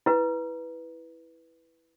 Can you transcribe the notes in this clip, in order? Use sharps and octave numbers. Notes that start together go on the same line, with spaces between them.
E4 B4